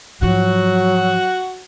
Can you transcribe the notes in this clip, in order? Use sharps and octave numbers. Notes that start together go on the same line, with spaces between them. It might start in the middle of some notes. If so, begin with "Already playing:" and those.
G#2 F3 F#3 F#4